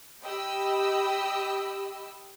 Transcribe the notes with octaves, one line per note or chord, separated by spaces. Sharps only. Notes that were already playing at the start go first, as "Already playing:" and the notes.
G4 D#5 G5 B5 E6